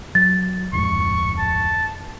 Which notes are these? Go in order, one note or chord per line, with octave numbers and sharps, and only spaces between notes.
F#3 A6
D1 F2 G#2 C#6
A5